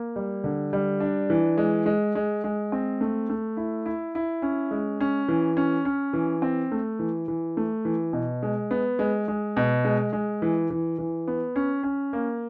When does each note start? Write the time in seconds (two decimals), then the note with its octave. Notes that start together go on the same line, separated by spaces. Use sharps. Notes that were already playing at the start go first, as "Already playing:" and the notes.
Already playing: A#3
0.16 G3
0.44 D3
0.73 G3
1.00 D4
1.30 E3
1.57 G#3
1.86 G#3
2.15 G#3
2.44 G#3
2.72 C4
3.01 A3
3.30 A3
3.57 E4
3.86 E4
4.15 E4
4.42 C#4
4.71 G#3
5.00 C#4
5.28 E3
5.57 C#4
5.85 C#4
6.13 E3
6.42 C4
6.72 A3
6.99 E3
7.28 E3
7.57 A3
7.85 E3
8.13 B2
8.43 G#3
8.71 B3
8.99 G#3
9.28 G#3
9.57 B2
9.84 G#3
10.13 G#3
10.42 E3
10.70 E3
10.98 E3
11.28 B3
11.56 C#4
11.83 C#4
12.13 A#3